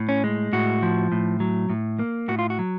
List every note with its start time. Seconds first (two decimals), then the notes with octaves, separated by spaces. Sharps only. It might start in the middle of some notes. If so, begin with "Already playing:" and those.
Already playing: A2
0.09 C#4
0.24 G#3
0.53 A2 F#4
0.83 F3
1.12 A2
1.40 F#3
1.70 A2
1.99 A#3
2.28 A2 F#4
2.39 F4
2.50 F#4
2.59 F#3